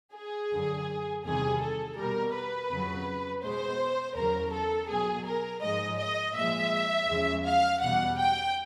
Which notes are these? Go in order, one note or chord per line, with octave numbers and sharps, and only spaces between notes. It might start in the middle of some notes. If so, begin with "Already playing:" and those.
G#4
F#2 D3 F#3
E2 C3 D#3 G3 G#4
A4
B2 G3 A#4
B4
F2 C#3 F#3
B2 G#3 C5
E2 C#3 F#3 A#4
A4
B2 F#3 G#4
A#4
G#2 F3 G#3 D#5
D#5
A#2 F3 G#3 E5
E2 C#3 F3 G#3
F5
E2 B2 G3 F#5
G5